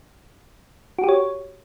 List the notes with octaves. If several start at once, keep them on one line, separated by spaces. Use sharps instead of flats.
F#4
G4
C#5